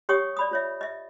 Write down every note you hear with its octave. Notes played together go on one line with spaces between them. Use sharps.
G4 C#5 G5 C#6 D#6
D5 B5 D#6
F4 C#5 E5
D#5 E5